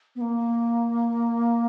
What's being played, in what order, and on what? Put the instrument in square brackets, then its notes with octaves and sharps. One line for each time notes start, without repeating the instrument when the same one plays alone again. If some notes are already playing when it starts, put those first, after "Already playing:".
[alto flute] B3
A#3